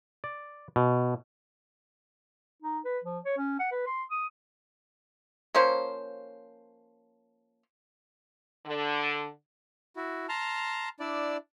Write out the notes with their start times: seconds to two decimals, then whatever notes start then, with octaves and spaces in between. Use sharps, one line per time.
0.24 D5
0.76 B2
2.62 D#4
2.85 B4
3.04 F3
3.25 C#5
3.38 C#4
3.59 F#5
3.71 B4
3.87 C6
4.10 D#6
5.54 F3 A#3 C#4 C5
8.66 D3
9.96 E4 F#4
10.29 A5 A#5 C6 F6
11.00 D4 E4 D5